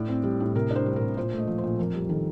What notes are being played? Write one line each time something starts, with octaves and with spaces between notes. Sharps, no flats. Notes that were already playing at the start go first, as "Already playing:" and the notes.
Already playing: A2 D5
C4
G3
A2
C3 A#4
D4 C5
G3
A#4
C3
A#2 C5
A3
D#5
F3
C5
A#2
F2 A#4
G3
D#3 A4